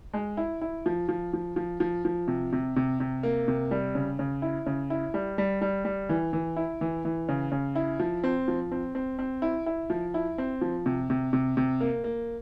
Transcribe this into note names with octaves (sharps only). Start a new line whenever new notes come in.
G#3
E4
E4
F3
F3
F3
F3
F3
F3
C3
C3
C3
C3
A#3
C3
G3
C#3
C#3
E4
C#3
E4
G3
G3
G3
G3
E3
E3
E4
E3
E3
C#3
C#3
E4
F3
C4
F3
C4
C4
C4
E4
E4
F3
E4
C4
F3
C3
C3
C3
C3
A#3
A#3